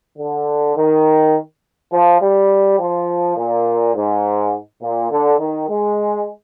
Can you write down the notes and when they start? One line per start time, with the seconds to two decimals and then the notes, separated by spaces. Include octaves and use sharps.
0.18 D3
0.76 D#3
1.92 F3
2.21 G3
2.79 F3
3.37 A#2
3.95 G#2
4.82 A#2
5.11 D3
5.40 D#3
5.69 G#3